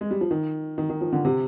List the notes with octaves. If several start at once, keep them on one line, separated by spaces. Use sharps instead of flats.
G#3
G3
F3
D#3
D#3
D#3
F3
D3
C3